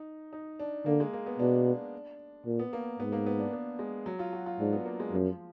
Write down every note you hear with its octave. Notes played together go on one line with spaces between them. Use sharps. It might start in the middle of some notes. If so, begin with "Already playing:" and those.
Already playing: D#4
D#4
D4
D3 A#3
G#3
A#3
B3
B2 D4
A#2
B3
A#3
G#2 B3
A#3
B3
D4
B3
G#3
F#3
F4
F#4
F4
G#2 D4
B3
A#3
G#3
F#2 F3